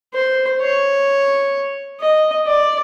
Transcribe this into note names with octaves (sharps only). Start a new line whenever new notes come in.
C5
C#5
D#5
D5